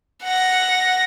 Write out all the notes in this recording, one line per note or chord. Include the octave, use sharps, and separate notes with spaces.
F#5 A#6